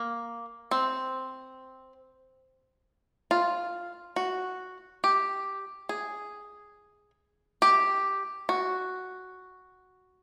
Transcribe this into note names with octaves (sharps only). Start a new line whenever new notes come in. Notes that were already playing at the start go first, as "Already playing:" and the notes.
Already playing: A#3
C4
F4
F#4
G4
G#4
G4
F#4